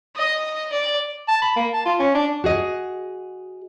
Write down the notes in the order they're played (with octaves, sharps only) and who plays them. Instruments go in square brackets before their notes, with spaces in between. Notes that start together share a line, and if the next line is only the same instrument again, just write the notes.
[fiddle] D#5
D5
[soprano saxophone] A5
B5
A#3
A5
F4
C#4
D4
[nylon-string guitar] F#4 G#4 D#5